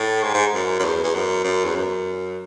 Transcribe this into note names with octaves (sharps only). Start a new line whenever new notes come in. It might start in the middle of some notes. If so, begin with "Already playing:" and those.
Already playing: A2
G#2
G#2
F#2
F#2
E2
E2
F#2
F#2
E2
F#2